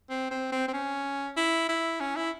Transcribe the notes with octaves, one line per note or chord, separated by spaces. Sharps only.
C4
C4
C4
C4
C#4
E4
E4
C#4
E4